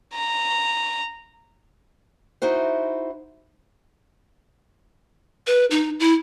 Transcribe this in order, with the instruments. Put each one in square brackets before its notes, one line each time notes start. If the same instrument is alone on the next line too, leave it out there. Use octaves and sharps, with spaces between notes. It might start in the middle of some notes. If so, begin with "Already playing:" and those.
[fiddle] A#5
[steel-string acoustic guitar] D#4 E4 F#4 C5
[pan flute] B4
D#4
E4